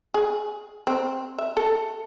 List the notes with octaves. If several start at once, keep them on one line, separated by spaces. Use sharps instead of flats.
G#4
C4
E5
A4